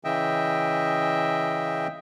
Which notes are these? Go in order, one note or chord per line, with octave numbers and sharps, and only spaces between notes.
C#3 E3 D#5 E5 G5